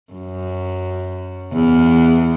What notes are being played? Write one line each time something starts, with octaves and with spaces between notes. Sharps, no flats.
F#2
E2